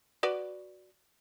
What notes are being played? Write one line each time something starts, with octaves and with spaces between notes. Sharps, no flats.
F#4 B4 D5